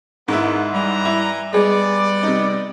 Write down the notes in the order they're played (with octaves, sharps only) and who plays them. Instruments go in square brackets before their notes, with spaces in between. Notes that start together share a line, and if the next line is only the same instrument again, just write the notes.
[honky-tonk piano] G#2 E4 [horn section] D#3 B3
[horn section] E3 A#5 [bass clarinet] G3
[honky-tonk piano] E4
[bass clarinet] G3 [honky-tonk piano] G#3 G#4 [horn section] B3 D5
[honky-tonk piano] C3 D#4